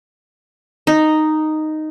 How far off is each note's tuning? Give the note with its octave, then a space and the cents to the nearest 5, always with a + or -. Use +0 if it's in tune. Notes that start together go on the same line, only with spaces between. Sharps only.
D#4 -5